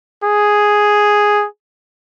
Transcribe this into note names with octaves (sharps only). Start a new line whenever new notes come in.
G#4